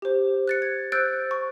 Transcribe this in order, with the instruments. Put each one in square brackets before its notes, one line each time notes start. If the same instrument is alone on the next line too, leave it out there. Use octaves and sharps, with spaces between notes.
[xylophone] G4 C5
F#6 A6 C#7
G#6
C5 E6 F#6 G6 A6 D7
C#6